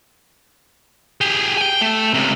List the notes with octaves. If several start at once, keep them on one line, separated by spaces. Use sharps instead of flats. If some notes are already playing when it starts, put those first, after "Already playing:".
G4 G#4
G5 G#5
A3
C#2 C3